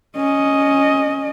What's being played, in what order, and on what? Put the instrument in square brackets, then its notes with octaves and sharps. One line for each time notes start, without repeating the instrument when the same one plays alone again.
[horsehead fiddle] C#4 D#5